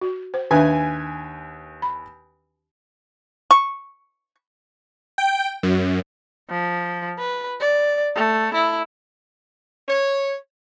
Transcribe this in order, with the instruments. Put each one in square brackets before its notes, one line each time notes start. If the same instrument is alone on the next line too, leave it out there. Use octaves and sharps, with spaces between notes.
[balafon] F#4
C5
[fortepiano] D#2 B4 G#5 [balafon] D#3 D4 E5
[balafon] B5
[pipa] C#6
[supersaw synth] G5
F#2
[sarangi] F3
B4
D5
A3
E4
[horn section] C#5